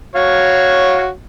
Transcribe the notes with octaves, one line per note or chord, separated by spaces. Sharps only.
F#4 C#5 F5